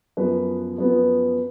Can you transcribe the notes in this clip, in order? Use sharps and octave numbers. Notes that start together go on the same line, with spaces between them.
F#2 F3 B3 B4
F#2 F3 B3